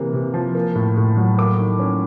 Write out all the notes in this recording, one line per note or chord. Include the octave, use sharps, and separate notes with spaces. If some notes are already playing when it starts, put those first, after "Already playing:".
Already playing: C3 E3 A#3
C3
F3
A#3
A2
A2
F#3
A#3 D6
D#3
C#4